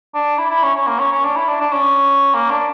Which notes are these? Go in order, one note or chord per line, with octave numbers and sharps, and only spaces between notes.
D4
E4
E4
C#4
C#4
A#3
C#4
C#4
D4
E4
D4
D4
C#4
A#3
D4